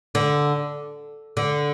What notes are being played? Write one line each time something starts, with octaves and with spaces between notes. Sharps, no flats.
D3
D3